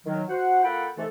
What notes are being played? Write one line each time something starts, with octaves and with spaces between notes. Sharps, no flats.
D#3 F#3
F#4 C5 F#5
A#3 F4 A4 F#5 G5 B5
C3 D#3 E3 A3 A4